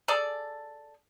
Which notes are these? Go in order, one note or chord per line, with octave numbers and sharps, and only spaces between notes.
G#4 A4 D5